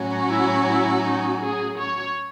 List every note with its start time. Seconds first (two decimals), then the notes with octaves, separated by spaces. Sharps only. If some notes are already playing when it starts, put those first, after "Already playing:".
Already playing: A2 F#3 C#4 F#4
0.30 E4
0.67 E4
1.04 D#4
1.42 G#4
1.79 C#5